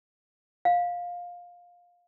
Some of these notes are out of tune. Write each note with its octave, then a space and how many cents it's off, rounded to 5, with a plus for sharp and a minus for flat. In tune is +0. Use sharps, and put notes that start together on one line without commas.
F5 +15